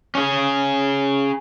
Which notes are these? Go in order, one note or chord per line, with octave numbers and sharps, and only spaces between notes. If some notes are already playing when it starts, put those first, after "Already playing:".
C#4 G#4